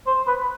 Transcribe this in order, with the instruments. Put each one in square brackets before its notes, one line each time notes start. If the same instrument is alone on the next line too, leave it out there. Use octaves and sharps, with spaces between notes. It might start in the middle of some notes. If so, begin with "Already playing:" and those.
[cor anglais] C5
B4